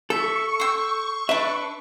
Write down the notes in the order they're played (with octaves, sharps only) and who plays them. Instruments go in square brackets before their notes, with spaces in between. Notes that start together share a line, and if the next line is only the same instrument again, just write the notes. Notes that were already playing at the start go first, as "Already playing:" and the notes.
[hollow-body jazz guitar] A4 [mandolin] E5 [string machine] C#6
[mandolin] C5 E6
[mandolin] D4 B4 [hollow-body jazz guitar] E5